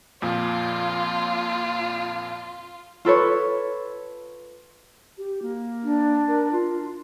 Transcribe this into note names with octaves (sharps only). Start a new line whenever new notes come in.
F2 A#2 F3 F4
F4 A4 B4 C#5
G4
A#3
D4
A#4
F4